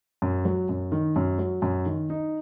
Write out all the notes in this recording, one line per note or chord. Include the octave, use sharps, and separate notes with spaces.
F#2
F#3
F#2
D#3
F#2
F#3
F#2
D#3
D#4